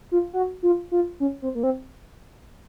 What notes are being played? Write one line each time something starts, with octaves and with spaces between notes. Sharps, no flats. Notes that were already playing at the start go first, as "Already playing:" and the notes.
F4
F#4
F4
F4
C#4
C4
A#3
C4